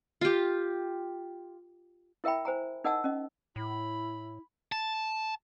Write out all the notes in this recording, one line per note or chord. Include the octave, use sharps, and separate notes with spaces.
F4 G4
E4 A#4 E5 G5 B5
C5 G#5 A#5
D#4 A#4 D#5 F#5 A5 E6
C#4 D#5
A2 E4 B5
A5